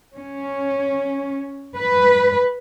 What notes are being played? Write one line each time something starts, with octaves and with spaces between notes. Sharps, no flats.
C#4
B4